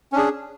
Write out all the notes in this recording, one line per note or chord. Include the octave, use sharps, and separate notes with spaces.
C#4 D4 G#4